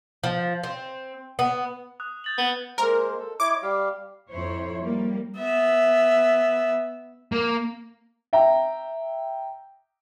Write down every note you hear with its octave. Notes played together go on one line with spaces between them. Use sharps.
F3
C4
B3
D#6 F#6
G6 A6 F#7
B3
G#3 A#3 A#4 C5
A4
E4 C#5 D#5 D6
G3 G4 F5
F2 E4 C5 C#5
G3 A#3
B3 E5
A#3
E5 G5 A#5